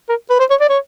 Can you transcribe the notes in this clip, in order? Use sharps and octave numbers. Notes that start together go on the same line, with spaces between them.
A#4
B4
C5
C#5
D5
C#5